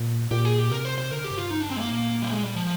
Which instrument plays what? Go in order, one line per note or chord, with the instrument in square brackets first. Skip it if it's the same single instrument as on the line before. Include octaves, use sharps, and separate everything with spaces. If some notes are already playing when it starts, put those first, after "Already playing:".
Already playing: [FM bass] A#2
[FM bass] A#2 [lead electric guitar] G4
[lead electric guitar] G#4
G4
[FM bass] C3 [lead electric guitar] A#4
[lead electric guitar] C5
C5
[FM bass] D3 [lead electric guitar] A#4
[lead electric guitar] G4
[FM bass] G2
[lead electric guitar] F4
D#4
D4
C4
G#3
A#3
[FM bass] A#2
[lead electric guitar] G3
G#3
G3
F3